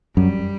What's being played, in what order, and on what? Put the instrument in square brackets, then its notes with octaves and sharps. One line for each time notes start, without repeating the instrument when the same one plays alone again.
[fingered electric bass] F#2 [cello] G3